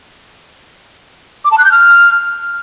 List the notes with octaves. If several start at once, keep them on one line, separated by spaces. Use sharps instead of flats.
D6
A5
F#6
G6
F6